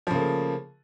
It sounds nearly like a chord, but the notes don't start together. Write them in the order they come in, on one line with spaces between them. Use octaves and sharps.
F3 C#3 A#3 A3